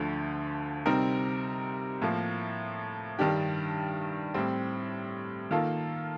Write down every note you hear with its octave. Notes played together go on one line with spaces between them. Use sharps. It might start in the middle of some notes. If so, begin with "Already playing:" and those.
Already playing: D2 D3 F3 A3
C3 G3 C4 D#4 A#4
A2 F3 A#3
G2 D#3 G3 D4 G4
A2 G3 C4
D#3 A#3 F4 A4